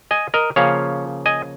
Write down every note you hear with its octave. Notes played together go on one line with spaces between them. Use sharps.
D#5 G#5
A#4 D#5
C#3 F3 A#3 C#4 C#5 F5
D#5 G#5